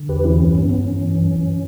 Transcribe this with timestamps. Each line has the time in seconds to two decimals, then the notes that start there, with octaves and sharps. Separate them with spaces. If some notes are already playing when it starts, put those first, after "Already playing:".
Already playing: D3
0.09 E2 G4 B4
0.24 E3 C#4 E4
0.36 C#4
0.39 G2
0.46 C#4
0.55 G2 B3
0.69 G2 C#4
0.85 G2
1.00 E3
1.15 F#2
1.31 E3